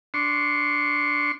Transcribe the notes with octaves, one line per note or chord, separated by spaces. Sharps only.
D4 C6 C#6